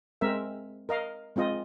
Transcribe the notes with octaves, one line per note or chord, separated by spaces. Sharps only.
G#3 C4 A#4 E5
A#4 D#5 F5
G#3 C4 F4 D#5